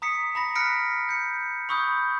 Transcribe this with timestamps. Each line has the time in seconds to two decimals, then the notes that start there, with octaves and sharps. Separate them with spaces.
0.02 A#5 D#6 B6 C#7
0.35 A#5 B5 A#6
0.55 F6 F#6 A#6 B6 C#7 D7
1.09 G6 C#7
1.69 B5 C#6 D#6 E6 G6